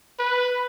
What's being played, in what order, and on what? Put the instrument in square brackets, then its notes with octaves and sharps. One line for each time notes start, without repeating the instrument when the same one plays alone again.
[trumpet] B4